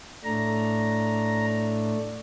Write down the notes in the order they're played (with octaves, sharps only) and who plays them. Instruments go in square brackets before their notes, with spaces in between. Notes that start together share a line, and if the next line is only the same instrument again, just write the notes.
[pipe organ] A2 A3 D4 A#5